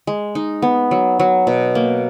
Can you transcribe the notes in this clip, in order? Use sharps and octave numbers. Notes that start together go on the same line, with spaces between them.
G#3
D#4
B3
F#3
F#3
B2
A#3